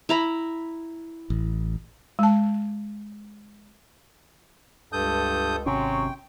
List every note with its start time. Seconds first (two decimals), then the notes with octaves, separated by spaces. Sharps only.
0.09 E4 A#5 B5
1.30 A1
2.19 G#3 A5
4.93 C#2 G2 A4 D#6 G6
5.66 G#1 C3 F#3 C#4 G5 C6 C#6